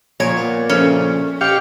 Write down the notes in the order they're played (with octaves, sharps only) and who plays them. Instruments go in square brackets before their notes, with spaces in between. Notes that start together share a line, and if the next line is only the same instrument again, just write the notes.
[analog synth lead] A#2 [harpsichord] F3 A#4 G#5 [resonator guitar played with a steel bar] C#5
[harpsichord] B3
[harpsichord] C#3 F3 A3 [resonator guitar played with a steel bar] C#4
[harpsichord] B2 [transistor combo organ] G4 F5 [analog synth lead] C#7